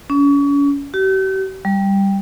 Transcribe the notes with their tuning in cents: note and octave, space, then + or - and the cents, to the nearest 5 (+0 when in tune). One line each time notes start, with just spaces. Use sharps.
C#4 +35
G4 -40
G3 +5